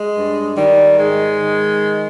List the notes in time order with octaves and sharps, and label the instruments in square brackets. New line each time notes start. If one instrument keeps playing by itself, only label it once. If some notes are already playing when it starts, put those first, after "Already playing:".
Already playing: [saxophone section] G#3
G2
D#3 G3
G#2 G#3
D#3